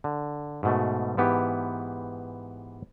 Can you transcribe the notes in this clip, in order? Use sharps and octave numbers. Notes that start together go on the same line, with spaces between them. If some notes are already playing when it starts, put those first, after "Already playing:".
D3
G#2 B2 A3
G#2 E3 B3 G4